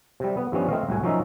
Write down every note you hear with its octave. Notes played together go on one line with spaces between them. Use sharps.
C3 G3
B3
G2 E3 F3 G3 B3 C#4
A3 C4 D#5 F5
C2 A2 F#4 G#5
F3 F#3 C#4 D#4 A#4 E5